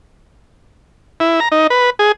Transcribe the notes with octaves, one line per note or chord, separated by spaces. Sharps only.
E4
A#5
D#4
B4
G#4